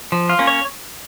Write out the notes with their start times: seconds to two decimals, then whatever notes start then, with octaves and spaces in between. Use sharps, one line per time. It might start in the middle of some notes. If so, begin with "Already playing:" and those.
0.12 F3
0.29 F4
0.39 A#3 C#4
0.47 C#5